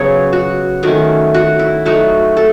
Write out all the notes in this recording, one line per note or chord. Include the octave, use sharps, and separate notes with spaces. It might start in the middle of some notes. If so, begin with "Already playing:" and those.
Already playing: C#3 F#3 B3 C#5
F#4
D#3 A3 C#4 F#4
F#4
E4
F#3 A3 D#4 F#4
A4